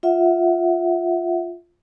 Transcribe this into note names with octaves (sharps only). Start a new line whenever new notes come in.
F4 E5 F#5